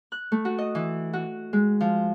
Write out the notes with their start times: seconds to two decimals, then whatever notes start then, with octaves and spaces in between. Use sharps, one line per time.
0.12 F#6
0.32 A3
0.45 F#4
0.58 D#5
0.75 E3
1.13 F#4
1.53 G#3
1.81 F3